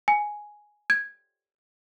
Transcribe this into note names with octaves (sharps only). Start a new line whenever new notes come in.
G#5
G#6